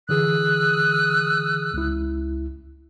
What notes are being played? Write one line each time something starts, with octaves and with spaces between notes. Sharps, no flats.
D3 E3 G#4 D#6 E6 F#6
C#2 E4